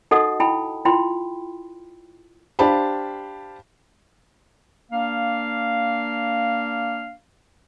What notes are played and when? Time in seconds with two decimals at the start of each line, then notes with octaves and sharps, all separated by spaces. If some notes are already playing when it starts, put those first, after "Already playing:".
0.11 D#4 F#4 A4 D#5 F#5 D#6
0.40 E4 G5 A5 B5
0.85 E4 F4 G5 B5 C6
2.59 D4 G4 C5 F5 A5 B5
4.91 A#3 D4 F5